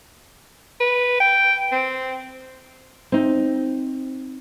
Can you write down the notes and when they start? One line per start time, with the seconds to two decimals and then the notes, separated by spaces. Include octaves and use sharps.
0.81 B4
1.20 G5
1.72 C4
3.12 C4 D#4